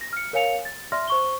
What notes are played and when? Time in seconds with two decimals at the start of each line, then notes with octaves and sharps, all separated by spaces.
0.01 A#6
0.13 F6 C#7
0.33 A#4 C#5 F5 G#5 C#7 F7
0.65 A6
0.92 D5 E5 C6 F6 A#6
1.08 C5 C#6 G7